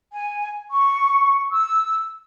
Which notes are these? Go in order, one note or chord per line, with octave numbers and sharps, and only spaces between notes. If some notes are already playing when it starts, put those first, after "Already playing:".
G#5
C#6
E6